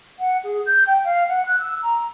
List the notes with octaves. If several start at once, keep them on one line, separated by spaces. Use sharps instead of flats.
F#5
G#4
G6
G5
F5
F#5
F#6
E6
A#5